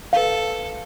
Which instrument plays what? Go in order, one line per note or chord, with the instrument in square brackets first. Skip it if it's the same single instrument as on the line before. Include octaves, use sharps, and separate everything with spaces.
[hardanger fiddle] A4 [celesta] B4 F5